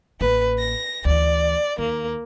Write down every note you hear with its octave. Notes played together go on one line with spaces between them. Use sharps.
A1 A#3 B4
A#6
D2 E3 D5
D#2 A#3